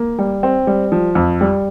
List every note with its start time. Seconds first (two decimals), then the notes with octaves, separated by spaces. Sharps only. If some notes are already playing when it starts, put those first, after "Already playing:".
Already playing: A#3
0.19 G3
0.43 C4
0.67 G3
0.92 F3
1.15 F2
1.41 G3